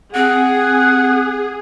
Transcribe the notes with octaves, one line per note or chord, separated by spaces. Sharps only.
C4 G#4 F#5